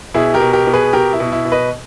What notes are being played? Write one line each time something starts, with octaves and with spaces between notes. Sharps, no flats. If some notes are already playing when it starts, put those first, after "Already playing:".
B2 E4 G#4
G4 A#4
B2
G4 A#4
B2
G#4 B4
B2 G4 A#4
E4
B2
E4
B2
B4 D#5